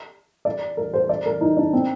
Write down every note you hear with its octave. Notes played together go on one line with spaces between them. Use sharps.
D5
A#4
C5
D5
A#4
D#4
D4
C4